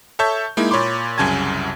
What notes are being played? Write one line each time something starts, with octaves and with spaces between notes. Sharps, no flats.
A4 C#5 E5 A5 C#6 G6
G#3 A#3 D#4 E4
A#2 C#5 B5 C6 D6
C2 F#2 C#3 G#5 A5 G#6